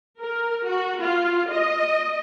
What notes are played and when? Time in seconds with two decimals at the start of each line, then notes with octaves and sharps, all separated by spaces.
0.20 A#4
0.66 F#4
1.01 F4
1.53 D#5